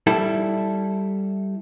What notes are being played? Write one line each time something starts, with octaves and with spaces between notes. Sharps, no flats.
G3 E4 A4